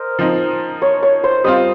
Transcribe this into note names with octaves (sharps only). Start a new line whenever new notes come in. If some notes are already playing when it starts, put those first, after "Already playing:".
Already playing: A#4 C5 D#5
F3 C4 D#4
C#5
C#5
C5
G3 C4 F4 D#5